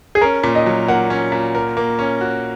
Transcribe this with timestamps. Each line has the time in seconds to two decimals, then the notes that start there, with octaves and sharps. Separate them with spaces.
0.15 G#4
0.21 C#4 A#4
0.44 A#2
0.55 D#5
0.66 F#3
0.88 A#3 F#5
1.10 C#4
1.32 A#2
1.55 A#4
1.77 A#3
1.99 C#4
2.21 F#4